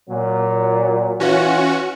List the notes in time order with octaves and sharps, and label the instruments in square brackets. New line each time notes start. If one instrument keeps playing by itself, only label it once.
[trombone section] A#2 F#3
[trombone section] E3 F4 [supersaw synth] C#4 F#4